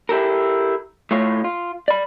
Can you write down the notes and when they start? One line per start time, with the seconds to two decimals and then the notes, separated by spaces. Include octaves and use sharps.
0.09 E4 G4 A4 A#4
1.11 A2 A3 F4 C#5
1.44 F4
1.88 D5 B5